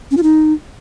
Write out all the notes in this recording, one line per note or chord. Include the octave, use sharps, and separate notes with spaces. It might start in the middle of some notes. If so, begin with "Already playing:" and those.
C#4
F4
D#4